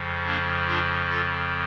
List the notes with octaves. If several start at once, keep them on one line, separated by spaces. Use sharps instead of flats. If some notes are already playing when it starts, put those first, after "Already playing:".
Already playing: F2 C#3 F3
A#3 D4
D4 F4
F4 A4